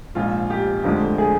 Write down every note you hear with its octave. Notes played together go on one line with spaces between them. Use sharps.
A#1 G#2 F3 F4
G4
F1 F2 D3 F3 G#3
G#4